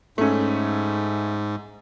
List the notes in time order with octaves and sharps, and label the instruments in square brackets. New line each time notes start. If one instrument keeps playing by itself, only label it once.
[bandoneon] G#2 [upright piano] A3 C#4